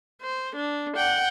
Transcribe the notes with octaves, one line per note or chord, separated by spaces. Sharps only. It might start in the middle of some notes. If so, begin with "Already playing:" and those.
C5
D4
F#5 G5